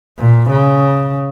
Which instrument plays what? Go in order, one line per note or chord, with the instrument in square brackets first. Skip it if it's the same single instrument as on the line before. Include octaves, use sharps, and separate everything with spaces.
[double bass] A#2
C#3